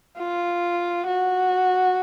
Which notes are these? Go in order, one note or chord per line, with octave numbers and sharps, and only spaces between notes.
F4
F#4